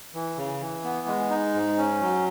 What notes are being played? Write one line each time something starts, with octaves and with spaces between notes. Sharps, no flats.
E3
C#3
E3
B3
G#3
D#4
G#2
C#4
F#3